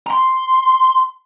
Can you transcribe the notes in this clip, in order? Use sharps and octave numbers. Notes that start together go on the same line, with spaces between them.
A#5 C6